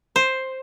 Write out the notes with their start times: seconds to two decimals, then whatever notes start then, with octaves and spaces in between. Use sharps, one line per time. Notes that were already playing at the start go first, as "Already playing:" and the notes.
0.16 C5